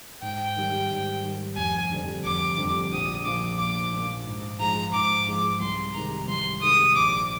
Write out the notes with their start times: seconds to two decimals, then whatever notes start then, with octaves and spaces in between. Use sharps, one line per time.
0.22 G#2 G5
0.56 D#3 G3
0.90 G#2
1.24 D#3 G3
1.57 F1 G#5
1.90 F2 D3 G3 D4
2.24 F1 D6
2.58 F2 D3 G3 D4
2.92 A#1 D#6
3.25 A#2 F3 D6
3.59 A#1 D6
3.93 A#2 F3
4.26 G#2
4.59 F3 G#3 D#4 A#5
4.93 G#2 D6
5.27 F3 G#3 D#4
5.60 C2 C6
5.94 C3 D#3 G#3 A#5
6.27 C2 C6
6.62 C3 D#3 G#3 D#6
6.95 A#1 D6